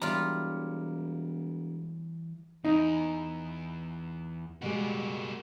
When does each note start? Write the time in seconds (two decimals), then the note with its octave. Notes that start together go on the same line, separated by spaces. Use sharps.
0.02 E1 E3 G3 F4 C#5 A#5
2.65 E2 D#4
4.62 B2 G3 G#3 A#3 F#4